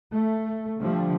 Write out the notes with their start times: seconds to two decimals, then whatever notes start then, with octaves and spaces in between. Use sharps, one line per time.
0.12 A3
0.79 D3 F3 G3 A3